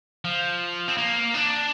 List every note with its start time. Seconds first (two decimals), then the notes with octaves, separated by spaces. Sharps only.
0.25 F3
0.88 C4
0.97 A#3
1.34 D4